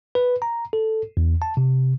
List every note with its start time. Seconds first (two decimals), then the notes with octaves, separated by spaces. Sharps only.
0.15 B4
0.42 A#5
0.73 A4
1.17 E2
1.42 A5
1.57 C3